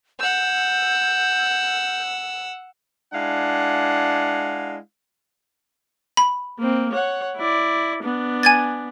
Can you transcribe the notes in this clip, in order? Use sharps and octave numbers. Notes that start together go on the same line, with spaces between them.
F#5 E6 G6
G#3 D4 E4 F5 F#5
B5
A#3 C4
C#5 F#5
E4 D5
B3 D4
G#5 G#6 A6